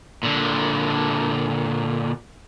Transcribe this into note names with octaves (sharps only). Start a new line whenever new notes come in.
A#2 D3